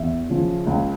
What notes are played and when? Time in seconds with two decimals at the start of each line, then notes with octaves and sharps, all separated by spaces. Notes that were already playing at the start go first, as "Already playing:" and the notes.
Already playing: E2 E5
0.30 C#3 F3
0.67 C#2